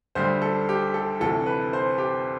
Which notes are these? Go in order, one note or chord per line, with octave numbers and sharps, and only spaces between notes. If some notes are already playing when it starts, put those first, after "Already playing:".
D2 D3 G3 C5
A4
G4
A4
D2 C3 E3 A4
B4
C5
G4